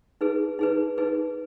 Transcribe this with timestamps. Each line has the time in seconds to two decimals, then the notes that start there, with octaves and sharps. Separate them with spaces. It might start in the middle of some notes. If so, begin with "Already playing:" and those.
0.21 D#4 G#4 B4
0.59 D#4 G#4 B4
0.98 D#4 G#4 B4